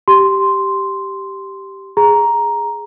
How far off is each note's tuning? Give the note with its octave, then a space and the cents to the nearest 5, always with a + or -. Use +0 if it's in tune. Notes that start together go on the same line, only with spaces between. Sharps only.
G4 -5 C6 -5
G#4 +0 A#5 +5